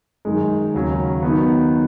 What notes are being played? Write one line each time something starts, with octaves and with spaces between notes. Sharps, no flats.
F#2 D#3 G#3
D#2 C#3 F#3 C#4
D#3 F#3 B3